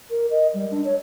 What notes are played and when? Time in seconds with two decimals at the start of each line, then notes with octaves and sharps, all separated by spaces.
0.10 A#4
0.31 D#5
0.54 G3
0.71 D4
0.85 C#5